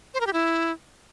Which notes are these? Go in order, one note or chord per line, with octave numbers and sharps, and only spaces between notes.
C5
A#4
G4
E4